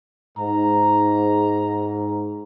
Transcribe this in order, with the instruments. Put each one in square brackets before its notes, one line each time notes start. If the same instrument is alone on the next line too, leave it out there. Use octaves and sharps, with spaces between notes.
[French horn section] G#2 [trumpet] A#5